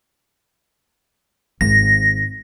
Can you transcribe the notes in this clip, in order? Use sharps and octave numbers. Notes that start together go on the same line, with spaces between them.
G#1 A#6